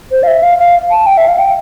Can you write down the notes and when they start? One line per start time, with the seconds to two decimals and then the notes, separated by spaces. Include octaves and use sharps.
0.11 C5
0.23 F5
0.27 E5
0.43 F5
0.59 F5
0.91 A5
1.06 G5
1.17 E5
1.28 F5
1.38 G5